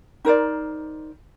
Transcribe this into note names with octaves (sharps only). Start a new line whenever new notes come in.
D#4 A#4 C5 D5